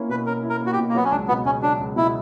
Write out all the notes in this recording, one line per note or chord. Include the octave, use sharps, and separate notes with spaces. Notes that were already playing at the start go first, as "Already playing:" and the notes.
Already playing: A#3 C#4 E4
B2 B4
C#4 A#4
E4
A#4
A#3 F#4
G4
B2
A#3
F#3 B3
C#4
C#2 D4
B2 B3
C#2 C#4
F#3 D4
C#2
B2 E4